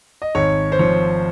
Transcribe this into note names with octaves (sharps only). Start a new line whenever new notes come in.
D#5
G#1 C#5
C5
F3 C#5